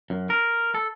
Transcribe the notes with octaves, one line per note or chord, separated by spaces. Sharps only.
F#2
A#4
A4